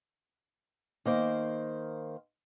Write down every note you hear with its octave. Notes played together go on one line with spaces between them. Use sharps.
D#3 A#3 C5